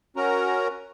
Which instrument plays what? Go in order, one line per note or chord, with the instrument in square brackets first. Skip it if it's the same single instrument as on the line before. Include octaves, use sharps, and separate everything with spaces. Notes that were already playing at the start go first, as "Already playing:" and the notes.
[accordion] C#4 F#4 A#4 A#5